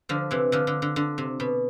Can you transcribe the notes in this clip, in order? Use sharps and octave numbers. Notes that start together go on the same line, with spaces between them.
D3 F3
C3 E3
D3 F3
D3
D3
D3
C3
B2